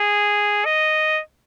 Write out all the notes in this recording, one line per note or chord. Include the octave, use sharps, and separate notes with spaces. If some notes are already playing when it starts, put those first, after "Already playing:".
Already playing: G#4
D#5